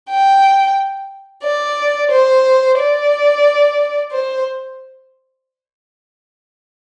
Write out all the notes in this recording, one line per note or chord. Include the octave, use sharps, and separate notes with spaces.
G5
D5
C5
D5
C5